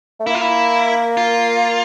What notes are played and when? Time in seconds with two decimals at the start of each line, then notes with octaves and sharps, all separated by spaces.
0.20 A3
0.26 A#3 E4
0.34 F4
0.41 E4
1.17 F4